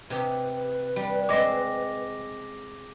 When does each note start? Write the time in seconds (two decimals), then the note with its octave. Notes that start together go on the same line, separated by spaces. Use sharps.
0.10 C3 G4 B4
0.96 G3
1.29 G#3 C4 D6 A#6